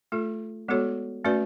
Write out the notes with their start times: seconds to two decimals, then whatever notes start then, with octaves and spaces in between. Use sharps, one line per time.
0.12 A3 F4 A4
0.68 G#3 B3 F#4 A4 C#5
1.24 A3 C#4 F#4 B4 D5